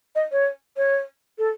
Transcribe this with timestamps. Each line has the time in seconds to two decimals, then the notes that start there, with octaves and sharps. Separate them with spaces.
0.15 D#5
0.32 C#5
0.77 C#5
1.38 A4